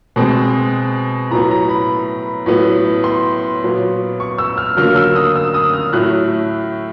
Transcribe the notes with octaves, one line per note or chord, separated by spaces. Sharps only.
B2 G#3 C4
A2 F#3 B3 A#5
A#5
B5
A2 F#3 B3
C6
A#2 F#3 B3
C#6
E6
F6
D3 F#3 A#3 F6
E6
D#6
E6
D#6
F6
A2 F#3 A3 F#6